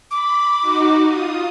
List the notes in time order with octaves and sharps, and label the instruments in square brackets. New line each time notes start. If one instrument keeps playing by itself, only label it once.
[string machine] B5 [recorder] D6
[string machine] D#4 F#4
F4 D#6